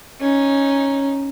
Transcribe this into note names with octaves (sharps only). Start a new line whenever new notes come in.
C#4 D#4